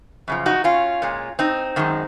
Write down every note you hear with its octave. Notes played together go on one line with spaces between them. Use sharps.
F#2 C#3 F3
D#4 F#4
C#4 F4
A#2 G#3
C4 D#4
F#2 D#3 G#3